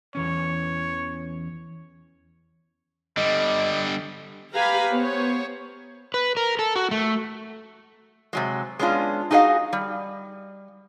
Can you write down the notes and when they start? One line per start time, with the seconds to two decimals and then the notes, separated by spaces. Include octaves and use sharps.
0.15 E2 E3 C#4 C#5
3.17 D3 G3 D#5
4.53 G4 B4 F5 G#5 A#5 B5
4.92 B3 C5 C#5
6.14 B4
6.37 A#4
6.59 A4
6.75 F#4
6.91 A3
8.33 C3 F#3 G#3
8.79 G#3 B3 C#4 D4 F4
9.31 D#4 F#4 G#4 A#4 D#5 F5
9.73 G3